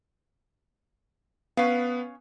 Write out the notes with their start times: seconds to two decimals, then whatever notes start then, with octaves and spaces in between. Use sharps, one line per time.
1.57 B3 C#4 B4 F5